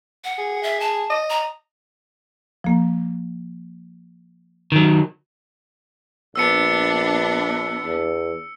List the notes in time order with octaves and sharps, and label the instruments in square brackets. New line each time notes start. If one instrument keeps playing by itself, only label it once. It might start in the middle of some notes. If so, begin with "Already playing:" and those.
[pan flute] F#5
[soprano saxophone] G#4
[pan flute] E5
A5
[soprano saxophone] D#5
[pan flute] A#5
[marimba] F3 A#3
[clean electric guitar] D#3 F#3
[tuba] A#1 [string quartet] B3 D4 [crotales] E6 C#7
[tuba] E2